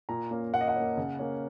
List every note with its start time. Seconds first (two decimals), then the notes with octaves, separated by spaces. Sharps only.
0.09 A#2 A#5
0.31 A#3 C#4
0.54 A#2 F#5
0.61 D#5
0.68 F#5
0.76 A#3 C#4
0.97 C#3
1.19 A#3 C#4